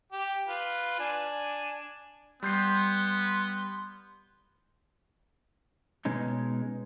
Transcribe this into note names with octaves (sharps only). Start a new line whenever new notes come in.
G4
F4 B4
D4 G#5
G3 B3 C6 G6 C7
B2 G#3 C#4 D#4